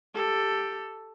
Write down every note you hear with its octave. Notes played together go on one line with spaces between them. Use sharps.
G4 A4